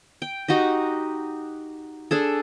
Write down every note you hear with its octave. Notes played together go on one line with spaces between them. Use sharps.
G5
D#4 F#4 G4 D#5
D4 G#4 A4